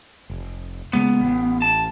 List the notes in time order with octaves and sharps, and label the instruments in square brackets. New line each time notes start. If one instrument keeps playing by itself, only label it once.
[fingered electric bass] F1
[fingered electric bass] C#3 G#3 A#3 [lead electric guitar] B3
[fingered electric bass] A1
[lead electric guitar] A5